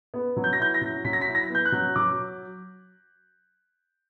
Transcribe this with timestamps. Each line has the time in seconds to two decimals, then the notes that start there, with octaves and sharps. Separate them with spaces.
0.14 B3
0.37 F#3
0.44 G6
0.53 A#6
0.59 E4 G6
0.74 A#6
0.81 F#3
1.05 F#3 B6
1.13 A#6
1.21 B6
1.27 E4
1.35 A#6
1.50 B3
1.55 G6
1.65 F#6
1.72 F#3
1.96 F#3 D6